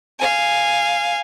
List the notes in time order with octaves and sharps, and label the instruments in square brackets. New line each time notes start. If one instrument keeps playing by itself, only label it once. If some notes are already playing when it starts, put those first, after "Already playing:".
[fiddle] F5 G#5